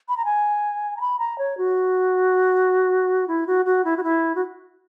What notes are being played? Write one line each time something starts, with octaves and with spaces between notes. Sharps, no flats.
B5
A#5
G#5
A#5
B5
A#5
C#5
F#4
E4
F#4
F#4
E4
F#4
E4
F#4